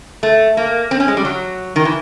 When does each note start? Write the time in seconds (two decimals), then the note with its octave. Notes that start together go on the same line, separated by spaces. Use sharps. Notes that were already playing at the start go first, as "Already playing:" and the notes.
0.23 A3
0.57 A#3
0.91 C4
1.00 C#4
1.08 G#3
1.17 G3
1.25 F#3
1.76 D#3
1.85 E3